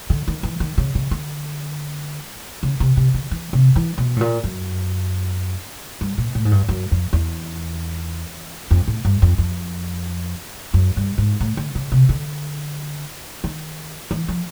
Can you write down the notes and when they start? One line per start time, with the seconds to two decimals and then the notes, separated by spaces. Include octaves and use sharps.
0.10 D3
0.28 D#3
0.43 E3
0.60 D#3
0.78 C#3
0.95 C#3
1.11 D3
2.63 C#3
2.80 C3
2.97 C3
3.14 D3
3.31 E3
3.53 C3
3.76 E3
3.98 B2
4.16 A2
4.21 A#2
4.44 F#2
6.01 G2
6.18 A#2
6.35 A2
6.45 G#2
6.51 G2
6.69 F#2
6.91 F2
7.13 E2
8.71 F2
8.88 A2
9.05 G2
9.22 F2
9.38 F2
10.74 F#2
10.97 G2
11.18 G#2
11.40 A2
11.57 D3
11.75 C#3
11.92 C3
12.09 D3
13.44 D#3
14.11 E3
14.28 F3